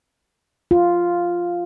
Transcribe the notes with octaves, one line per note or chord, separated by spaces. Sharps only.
F4